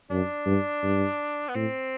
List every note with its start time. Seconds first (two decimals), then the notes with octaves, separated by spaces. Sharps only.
0.10 F#2 D4
0.46 G2
0.83 G2
1.49 B3
1.55 A2 C4